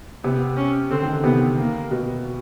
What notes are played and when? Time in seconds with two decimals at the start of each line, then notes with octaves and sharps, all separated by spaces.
0.24 C3 B3
0.57 C#4
0.90 D3 C4
1.02 D#3
1.13 D3
1.24 C3 B3
1.58 A#3
1.91 B2